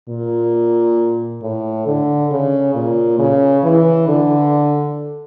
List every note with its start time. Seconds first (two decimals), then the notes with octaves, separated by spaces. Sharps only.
0.09 A#2
1.42 A2
1.87 D3
2.31 C#3
2.75 A#2
3.19 C#3
3.64 E3
4.08 D3